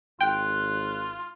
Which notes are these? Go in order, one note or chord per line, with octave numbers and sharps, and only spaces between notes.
G#1 F4 G5 F#6